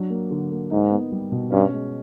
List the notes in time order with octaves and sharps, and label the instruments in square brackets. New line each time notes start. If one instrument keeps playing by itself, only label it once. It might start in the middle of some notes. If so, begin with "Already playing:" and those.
Already playing: [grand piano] F#3 D4
A#3
D3
A#3
[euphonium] G#2 [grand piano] D#4
[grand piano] B3
G3
B2
[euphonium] G2 [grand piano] C#4
[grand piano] G#3